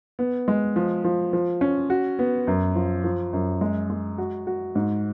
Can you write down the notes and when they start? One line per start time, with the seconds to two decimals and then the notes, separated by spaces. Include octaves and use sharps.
0.19 B3
0.48 G#3
0.76 F3
1.04 F3
1.33 F3
1.61 C#4
1.90 F#4
2.19 B3
2.47 F#2
2.76 F3
3.04 F3
3.33 F#2
3.61 G#3
3.90 G#3
4.18 F#4
4.47 F#4
4.75 G#2